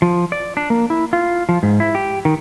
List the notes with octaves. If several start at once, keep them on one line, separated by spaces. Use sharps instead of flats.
F3
D5
D4
A#3
E4
F4
F3
G#2
E4
G4
D#3